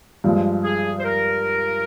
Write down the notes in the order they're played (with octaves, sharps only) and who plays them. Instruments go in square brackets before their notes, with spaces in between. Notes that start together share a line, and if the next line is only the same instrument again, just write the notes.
[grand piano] G2 F3 G#3
[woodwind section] G#4
C5
A#4